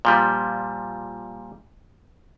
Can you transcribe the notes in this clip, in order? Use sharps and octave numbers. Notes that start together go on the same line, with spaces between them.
A#2 F3 G3